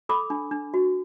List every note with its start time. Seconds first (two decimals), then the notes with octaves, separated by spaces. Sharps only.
0.09 A4 B5 D6
0.30 D4
0.51 D4
0.74 F#4